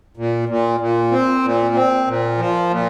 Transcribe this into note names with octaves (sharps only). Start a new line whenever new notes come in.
A#2
A#2
A#2
C4
A#2
C4
A#2
F3
A#2